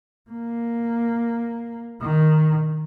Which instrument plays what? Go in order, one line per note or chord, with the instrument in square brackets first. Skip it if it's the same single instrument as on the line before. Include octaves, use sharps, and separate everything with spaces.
[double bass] A#3
D#3